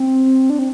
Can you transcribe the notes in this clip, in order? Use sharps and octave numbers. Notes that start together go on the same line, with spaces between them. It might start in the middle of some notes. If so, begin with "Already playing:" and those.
Already playing: C4
D4
C4